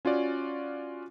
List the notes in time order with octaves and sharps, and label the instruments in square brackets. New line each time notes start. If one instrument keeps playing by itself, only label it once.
[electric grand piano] C#4 F4 F#4 D5